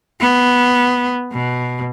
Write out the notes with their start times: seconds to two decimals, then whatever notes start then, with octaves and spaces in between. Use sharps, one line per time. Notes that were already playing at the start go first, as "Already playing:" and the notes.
0.20 B3
1.32 B2